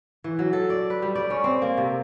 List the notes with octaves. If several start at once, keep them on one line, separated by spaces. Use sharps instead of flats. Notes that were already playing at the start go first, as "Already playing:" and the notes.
E3
F#3
A4
D5
B4
G3
D5
C#4
C4
A#3
C3